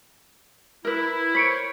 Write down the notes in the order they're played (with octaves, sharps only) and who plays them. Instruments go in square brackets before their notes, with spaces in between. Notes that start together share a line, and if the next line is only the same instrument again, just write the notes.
[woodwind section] E4 [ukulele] A#4 B4
[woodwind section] A#4 C5 C#5 [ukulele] B5 [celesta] B6 C#7 D7